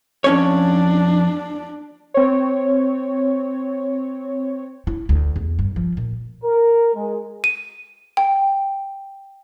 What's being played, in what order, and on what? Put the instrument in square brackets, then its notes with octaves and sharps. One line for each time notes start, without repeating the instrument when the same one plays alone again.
[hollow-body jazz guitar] F2 C#4 C#5 [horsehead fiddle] D4
[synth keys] C4 C#5
[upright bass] E4
D2
E2
G2
F3
A#2
[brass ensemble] A#4
G#3
[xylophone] D#7
G5